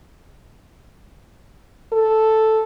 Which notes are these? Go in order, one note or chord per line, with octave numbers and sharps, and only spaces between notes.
A4